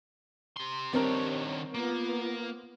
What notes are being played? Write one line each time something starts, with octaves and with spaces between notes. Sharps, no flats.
G4 C6
D#3 G3 C4 D4 A#4 C#5
A#3 B3 F4